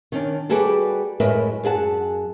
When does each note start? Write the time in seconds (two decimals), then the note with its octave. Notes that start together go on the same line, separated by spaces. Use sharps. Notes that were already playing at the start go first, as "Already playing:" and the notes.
0.12 D#3 C#4 D4
0.49 G3 F#4 G#4 A4 B4 D5
1.20 F#2 A2 G#3 A#4 B4 E5
1.64 F#2 G#4 F#5 A5